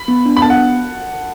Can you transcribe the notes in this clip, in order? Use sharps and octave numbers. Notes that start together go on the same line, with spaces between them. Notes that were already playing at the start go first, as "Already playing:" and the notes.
Already playing: B5
B3
D4
B5
B3 A5
F#5